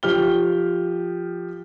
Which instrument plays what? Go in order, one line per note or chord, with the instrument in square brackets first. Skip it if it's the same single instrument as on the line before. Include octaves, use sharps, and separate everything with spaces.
[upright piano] F3 G4 F6 G7